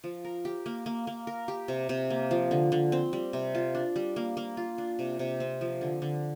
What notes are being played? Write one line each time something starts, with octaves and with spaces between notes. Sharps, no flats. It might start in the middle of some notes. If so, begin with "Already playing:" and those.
F3
A#4
G4
A#3
A#3
A#3
A#4
G4
C3
C3
A#3
F3
D3
D3
C4
G3
C3
F4
D4
G3
A#3
A#3
F4
D4
C3
C3
C4
F3
D3
D3